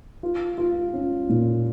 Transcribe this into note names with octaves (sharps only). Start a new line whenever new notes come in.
F4
F4
C#4
A#2